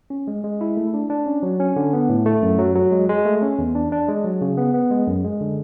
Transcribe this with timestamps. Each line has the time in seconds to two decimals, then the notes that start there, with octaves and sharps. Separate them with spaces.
0.10 C#4
0.27 G#3
0.44 G#3
0.61 E4
0.77 A3
0.94 D4
1.10 D4
1.26 C#4
1.43 F#3
1.60 C#4
1.76 D3
1.93 B3
2.09 A2
2.26 A3
2.42 F#2
2.58 F#3
2.75 F#3
2.92 G#3
3.09 G#3
3.25 A3
3.42 C#4
3.59 E2
3.75 D4
3.92 D4
4.08 G#3
4.24 F#3
4.41 C#3
4.57 B3
4.74 B3
4.91 G#3
5.07 F#2
5.24 G#3
5.41 D3